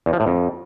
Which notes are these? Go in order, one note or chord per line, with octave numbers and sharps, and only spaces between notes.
E2
F3
A2
F2